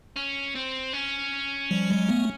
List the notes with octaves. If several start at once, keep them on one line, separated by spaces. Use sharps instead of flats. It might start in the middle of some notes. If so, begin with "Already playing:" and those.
C#4
C4
C#4
F3 G3
F#3 G#3
A3 B3